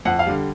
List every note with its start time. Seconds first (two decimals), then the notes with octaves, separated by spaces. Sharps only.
0.05 F2 F#5
0.19 F5
0.26 D3 G3